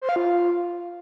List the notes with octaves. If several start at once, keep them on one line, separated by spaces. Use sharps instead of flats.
C5
F5
F4